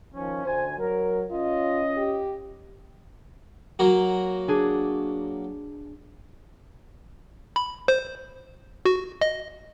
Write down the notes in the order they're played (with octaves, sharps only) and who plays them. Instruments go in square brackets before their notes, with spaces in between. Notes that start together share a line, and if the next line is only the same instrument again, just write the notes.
[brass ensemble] D#3 F3 C#4
[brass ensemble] D2 G#5 [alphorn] C5
[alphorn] F#3 [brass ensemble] A#4
[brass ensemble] C#4 D#5 [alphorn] F4
[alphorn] G4
[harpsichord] F#3 A#3 F#4
[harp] D4 G#4
[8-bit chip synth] B5
C5
F#4
D#5